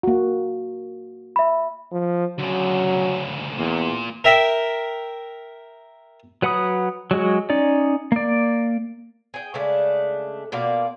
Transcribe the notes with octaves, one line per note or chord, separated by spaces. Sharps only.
A#3 F#4
E5 B5
F3
D2 C#3 F#3
E2 A#2
A#4 E5 G5
F#3 B4 F#5 B5 D#6
F#3 G#3 F#4
C#4 D#4 D5
A#3 D5
G#4 G5
C#3 G#3 A3 D4
B2 A#3 F4 D5